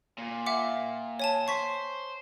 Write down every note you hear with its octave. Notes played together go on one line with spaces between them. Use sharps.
A#2
E5 F#5 D6
C#5 G#5 A5
C5 C#6 B6